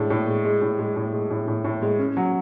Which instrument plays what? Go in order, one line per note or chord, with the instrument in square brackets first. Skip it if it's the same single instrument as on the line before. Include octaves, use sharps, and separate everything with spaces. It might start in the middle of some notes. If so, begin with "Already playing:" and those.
Already playing: [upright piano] A2 G#3 D4
A2
G#3
G#3
A2
G#3
A2
G#3
A2
A2
A2
G#3
C#4
F#3